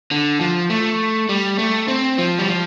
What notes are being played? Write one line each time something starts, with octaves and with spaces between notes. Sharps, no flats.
D3
F3
A3
G3
A3
C4
F3
G3
F3